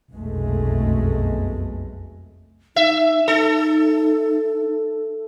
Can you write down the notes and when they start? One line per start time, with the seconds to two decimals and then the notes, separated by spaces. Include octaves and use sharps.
0.13 F1 B1 F#2 B2 G#3 A3
2.76 D#4 E5
3.28 D#4 A4